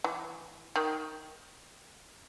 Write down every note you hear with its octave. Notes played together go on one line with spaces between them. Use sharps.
E3
D#3